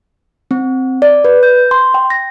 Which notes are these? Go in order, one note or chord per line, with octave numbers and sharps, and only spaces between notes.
C4
D5
B4
G6
C6
G5
A#6